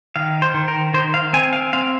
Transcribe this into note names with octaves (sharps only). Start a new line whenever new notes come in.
D#3 F5
C5
D#3
A#4
D#3 C5
F5
C4 G#5
F5
C4 F5